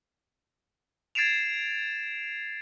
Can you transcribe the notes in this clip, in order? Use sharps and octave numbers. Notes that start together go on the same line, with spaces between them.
G#6 A6 C7 D7 E7 F7